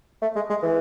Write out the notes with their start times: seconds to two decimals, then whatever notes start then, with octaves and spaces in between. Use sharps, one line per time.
0.22 A3
0.36 G#3
0.50 G#3
0.63 E3